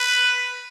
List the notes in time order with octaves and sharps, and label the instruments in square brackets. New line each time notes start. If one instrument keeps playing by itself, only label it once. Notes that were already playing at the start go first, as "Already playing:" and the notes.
Already playing: [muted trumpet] B4